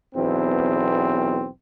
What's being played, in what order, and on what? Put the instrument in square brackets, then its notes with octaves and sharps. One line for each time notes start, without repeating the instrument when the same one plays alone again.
[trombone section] B1 E2 C4